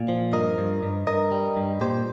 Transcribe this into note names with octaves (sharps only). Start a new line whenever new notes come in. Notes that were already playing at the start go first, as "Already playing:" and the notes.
Already playing: A#2
F3
G2 A#4 D#5
G2
G2
G2 A#4 D#5
G3
G2
A#2 G4 C5